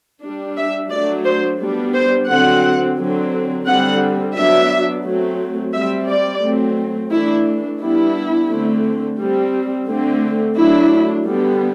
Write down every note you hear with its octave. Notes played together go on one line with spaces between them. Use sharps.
G3 D4
E5
F#3 A3 D4 D5
C5
G3 B3 D4
C5
D3 F#3 C4 F#5
D3 F#3 C4
D3 G3 C4 F#5
F#3 B3 D4 E5
F#3 A3 C4
G3 C4 E5
D5
F#3 A3 C4
E3 A3 D4 E4
G3 B3 D4 E4
D3 A3 C4
G3 C4
D3 A3 C4
F#3 A3 D4 E4
D3 G3 B3